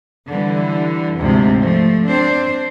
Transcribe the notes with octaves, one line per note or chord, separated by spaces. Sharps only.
D3 E3 G3
D2 G#2 C3 F3
F3 A3
C4 D4 C5